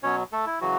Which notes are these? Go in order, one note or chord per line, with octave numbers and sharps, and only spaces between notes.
B2 F#3 C#4 C#5
A3 A4
E4
C#3 E3 F#3 F#4